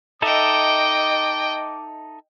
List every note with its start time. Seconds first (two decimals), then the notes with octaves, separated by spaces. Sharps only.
0.22 D#4 A4 D#5 E5 G5 D6